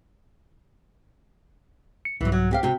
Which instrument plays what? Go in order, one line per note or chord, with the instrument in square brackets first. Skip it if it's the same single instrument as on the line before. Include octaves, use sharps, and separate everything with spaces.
[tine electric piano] C#7
[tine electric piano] C2 G#2 [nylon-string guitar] E3 F#3
[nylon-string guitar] F#3
C4 G4 F5
[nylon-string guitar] C3 G5 [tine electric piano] F#4